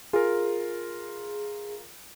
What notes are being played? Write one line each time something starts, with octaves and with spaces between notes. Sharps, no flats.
F4 G#4 A#4